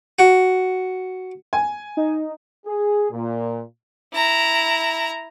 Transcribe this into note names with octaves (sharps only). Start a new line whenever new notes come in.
F#4
G#5
D#4
G#4
A#2
E4 A#5